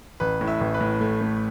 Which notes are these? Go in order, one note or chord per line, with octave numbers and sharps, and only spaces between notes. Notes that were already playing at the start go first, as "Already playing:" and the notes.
A1 B4
A2
E5
A1
B4
A2
A3
A3